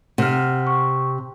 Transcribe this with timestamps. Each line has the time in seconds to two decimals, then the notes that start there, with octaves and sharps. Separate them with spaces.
0.18 C3 F#5 F6
0.67 C#6